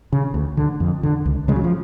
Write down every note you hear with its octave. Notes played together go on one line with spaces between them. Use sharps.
C#3
D2
D3
F2
D3
C#2
C#3 G#3
F#3
F3